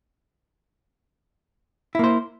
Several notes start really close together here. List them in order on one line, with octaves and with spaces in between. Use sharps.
E4 A#3 C5